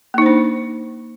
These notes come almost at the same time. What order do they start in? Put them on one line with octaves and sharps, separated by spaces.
A#3 D#4 C5 D4